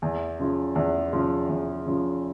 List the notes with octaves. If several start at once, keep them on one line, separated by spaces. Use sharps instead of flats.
E2
C#3 F3
E2
C#3 F3
E2
C#3 F3